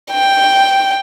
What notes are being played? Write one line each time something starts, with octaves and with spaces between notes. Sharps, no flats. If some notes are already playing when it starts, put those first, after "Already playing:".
G5